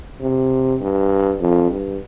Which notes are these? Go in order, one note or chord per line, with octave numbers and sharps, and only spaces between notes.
C3
G2
F2
G2